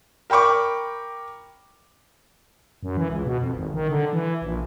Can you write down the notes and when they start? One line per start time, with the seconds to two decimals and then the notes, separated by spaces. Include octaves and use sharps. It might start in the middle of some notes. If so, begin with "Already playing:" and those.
0.30 A#4 G5 B5 C#6 D6
2.83 F#2
2.97 E3
3.09 C#2
3.26 B2
3.40 F2
3.55 G#1
3.74 D#3
3.89 D3
4.13 E3
4.42 A#1